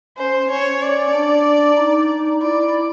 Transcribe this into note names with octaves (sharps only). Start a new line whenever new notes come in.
C#4 C5
C#4 C#5
D5
D4
D#4
E4 D5